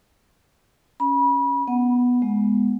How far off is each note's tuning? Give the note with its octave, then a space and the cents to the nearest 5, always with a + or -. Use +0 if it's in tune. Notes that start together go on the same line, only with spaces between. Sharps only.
C#4 +0 B5 -30
B3 -5 F#5 +0
G#3 +0 B3 -5